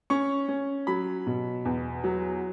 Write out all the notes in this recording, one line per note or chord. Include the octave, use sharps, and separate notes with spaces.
C#4 C#6
C#4
F#3 B5
B2
E2
F#3